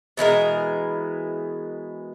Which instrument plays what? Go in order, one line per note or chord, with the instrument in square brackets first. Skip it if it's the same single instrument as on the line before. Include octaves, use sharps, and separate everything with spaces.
[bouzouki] B2 E3 G#3 A#4